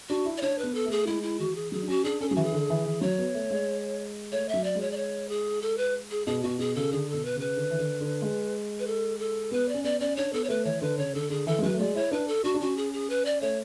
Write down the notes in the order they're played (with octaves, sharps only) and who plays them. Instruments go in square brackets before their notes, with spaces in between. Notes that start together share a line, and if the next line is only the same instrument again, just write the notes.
[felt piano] D4 [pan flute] F#4
[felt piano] E4
[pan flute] D5
[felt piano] D4 [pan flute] C#5
[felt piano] B3 [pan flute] B4
[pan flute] A4
[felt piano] A3
[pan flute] G#4
[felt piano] G#3 [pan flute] E4
[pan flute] E4
[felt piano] E3 [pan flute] F#4
[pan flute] G#4
[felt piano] F#3 [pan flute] G#4
[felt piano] D4
[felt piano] C#4 [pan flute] F#4
[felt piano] D4 [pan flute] G#4
[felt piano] C#4 [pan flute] A4
[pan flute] G#4
[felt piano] F#3
[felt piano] E3 [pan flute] F#4
[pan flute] G#4
[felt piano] D3
E3
E3
[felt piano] F#3 [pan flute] C#5
[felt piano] B3
A3
G#3
[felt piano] A3 [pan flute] C#5
[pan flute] E5
[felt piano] F#3
[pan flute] D5
[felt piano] G#3
[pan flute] C#5
D5
C#5
G#4
A4
B4
G#4
[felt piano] B2 [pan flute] G#4
[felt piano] B2 [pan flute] F#4
[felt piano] B2 [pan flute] G#4
[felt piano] C#3 [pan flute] A4
[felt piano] D3 [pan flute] G#4
[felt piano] B2 [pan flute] A4
[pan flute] B4
[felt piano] C#3 [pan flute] B4
[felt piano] D3
E3
D3
D3
G#3
[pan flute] B4
A4
A4
[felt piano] B3 [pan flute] B4
[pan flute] D5
[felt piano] C#4
[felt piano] B3 [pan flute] D5
[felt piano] C#4 [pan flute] D5
[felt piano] D4 [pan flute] C#5
[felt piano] B3 [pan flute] A4
[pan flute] C#5
[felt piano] A3 [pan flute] B4
[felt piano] E3 [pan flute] C#5
[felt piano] D3 [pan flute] B4
[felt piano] C#3 [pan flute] C#5
[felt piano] D3 [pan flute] A4
[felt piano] D3 [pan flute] G#4
[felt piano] E3 [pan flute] A4
[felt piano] G#3
[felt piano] F#3 [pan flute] B4
[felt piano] A3
[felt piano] G#3 [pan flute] D5
[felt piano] E4 [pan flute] C#5
[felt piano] D4 [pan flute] B4
[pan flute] A4
[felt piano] D4 [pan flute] F#4
[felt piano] D4
[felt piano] C#4 [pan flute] F#4
[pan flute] G#4
G#4
B4
D5
[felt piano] A3 [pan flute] C#5